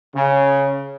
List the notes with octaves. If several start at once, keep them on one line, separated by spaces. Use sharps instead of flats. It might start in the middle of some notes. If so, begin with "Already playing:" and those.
C#3